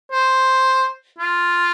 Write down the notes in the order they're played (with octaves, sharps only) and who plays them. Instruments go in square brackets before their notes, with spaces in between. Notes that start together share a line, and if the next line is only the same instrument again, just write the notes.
[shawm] C5
F4